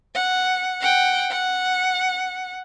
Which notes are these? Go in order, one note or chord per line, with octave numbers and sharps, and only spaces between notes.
F#5
F#5 G5
F#5